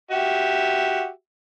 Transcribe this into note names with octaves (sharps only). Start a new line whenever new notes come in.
F#4 G4 E5